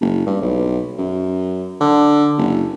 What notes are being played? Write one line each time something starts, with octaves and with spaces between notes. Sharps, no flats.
F#1
G2
B1
F#2
D3
F#1